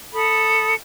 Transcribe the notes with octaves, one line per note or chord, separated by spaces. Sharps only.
A4 B5 D#6